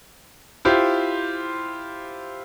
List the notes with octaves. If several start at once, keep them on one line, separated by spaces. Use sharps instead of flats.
E4 F4 G4 C5